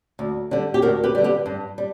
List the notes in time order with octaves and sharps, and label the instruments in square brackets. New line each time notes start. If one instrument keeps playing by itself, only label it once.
[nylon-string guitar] D2
D3 G3
G4
D2 F#4 A#4
G4 B4
D3 G3
G4 B4
G2
G3